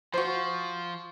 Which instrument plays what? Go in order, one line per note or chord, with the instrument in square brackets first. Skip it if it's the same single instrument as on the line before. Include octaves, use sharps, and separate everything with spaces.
[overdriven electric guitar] F3 [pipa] F#4 C5 [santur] F5 C6 C#6